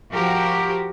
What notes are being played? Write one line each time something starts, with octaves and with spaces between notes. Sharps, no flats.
F3 F#4 G4 A#4